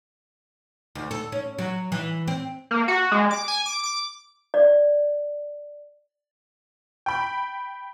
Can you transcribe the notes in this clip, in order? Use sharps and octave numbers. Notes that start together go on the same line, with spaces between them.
D2
A4
C#4
F#3
E3
C4
A#3
F#4
G#3
D6
G#5
D6
D6
D5
G5 B5